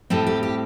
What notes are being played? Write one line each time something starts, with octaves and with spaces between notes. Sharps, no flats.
A2 G3 C4 A4
G4
G4